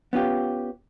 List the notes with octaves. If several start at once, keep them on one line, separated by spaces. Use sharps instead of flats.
B3 C#4 F4 G4